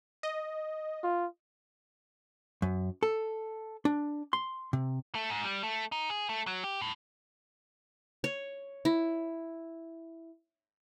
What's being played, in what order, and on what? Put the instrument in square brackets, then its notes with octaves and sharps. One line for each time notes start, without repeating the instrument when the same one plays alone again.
[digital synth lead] D#5
[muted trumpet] F4
[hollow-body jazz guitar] F#2
A4
D4
C6
C3
[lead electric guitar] A3
G#2
G3
A3
D#4
G#4
A3
F#3
G4
A2
[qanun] C#5
E4